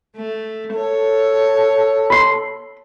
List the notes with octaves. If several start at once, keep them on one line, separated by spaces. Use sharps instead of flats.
A3
A4 C#5
B5 C6